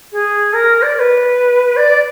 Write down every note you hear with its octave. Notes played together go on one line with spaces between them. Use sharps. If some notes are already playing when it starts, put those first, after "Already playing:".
G#4
A#4
D5
D5
B4
D5